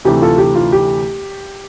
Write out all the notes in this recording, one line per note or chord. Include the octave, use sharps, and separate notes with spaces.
D2 C3 E3 A3 G4
F4 A4
G4
F4
G4